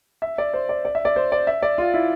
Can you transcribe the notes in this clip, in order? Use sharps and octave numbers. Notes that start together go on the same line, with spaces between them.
E5
D5
C5
D5
D5
E5
D5
C5
D5
E5
D5
F4
E4